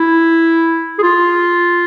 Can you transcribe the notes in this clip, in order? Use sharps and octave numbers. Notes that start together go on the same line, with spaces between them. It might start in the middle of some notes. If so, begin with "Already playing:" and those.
Already playing: E4
G#4
F4